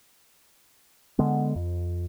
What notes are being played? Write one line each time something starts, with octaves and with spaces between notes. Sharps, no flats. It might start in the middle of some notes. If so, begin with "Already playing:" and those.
D3 G#3 B3
F2